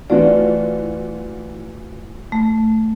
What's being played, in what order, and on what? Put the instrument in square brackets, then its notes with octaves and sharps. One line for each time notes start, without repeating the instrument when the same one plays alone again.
[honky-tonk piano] E3 F4 F#4 [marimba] A3 D5
[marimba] A3